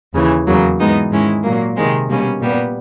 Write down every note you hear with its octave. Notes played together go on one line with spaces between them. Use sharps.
D#2 C#3 E3
E2 C#3 F#3 A#3
G#2 E3 G#3 B3 D#4
G#2 D#3 G#3 C#4 E4
A#2 F#3 A#3
C3 D#3 G#3 C4
B2 G3 A#3 C#4
A#2 G3 B3